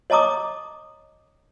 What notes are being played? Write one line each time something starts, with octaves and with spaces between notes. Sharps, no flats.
C#5 D#5 A5 A#5 D6 D#6